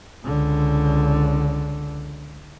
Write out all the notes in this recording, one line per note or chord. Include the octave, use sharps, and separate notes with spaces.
C#2 D3